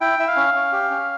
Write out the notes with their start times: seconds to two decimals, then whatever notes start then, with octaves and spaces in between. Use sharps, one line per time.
0.01 E4 G5
0.19 E4 E5
0.28 F5
0.36 C#4
0.54 C#4
0.72 G4
0.90 C#4